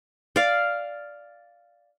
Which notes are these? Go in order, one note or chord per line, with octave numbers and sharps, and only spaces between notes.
D5 F5